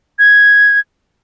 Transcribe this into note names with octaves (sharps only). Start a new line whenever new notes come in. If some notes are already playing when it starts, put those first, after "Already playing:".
G#6